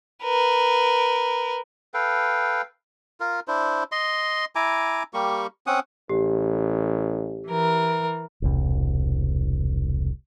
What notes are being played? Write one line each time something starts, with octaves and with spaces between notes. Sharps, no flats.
A#4 B4
A4 B4 F5 G5
F4 A#4
D4 E4 C5
D#5 C6
E4 G#5 A#5 D6
G3 A#3 G4 C#6
C4 C#4 F#5 D#6
A1 G4
E3 A#4
E1 C2